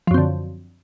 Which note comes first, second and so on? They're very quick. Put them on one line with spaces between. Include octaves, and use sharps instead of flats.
F3 F#2 C4 D3